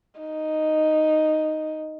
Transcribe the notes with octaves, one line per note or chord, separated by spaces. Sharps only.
D#4